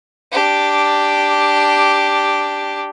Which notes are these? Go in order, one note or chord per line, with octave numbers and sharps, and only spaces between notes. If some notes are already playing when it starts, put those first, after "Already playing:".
D4 G4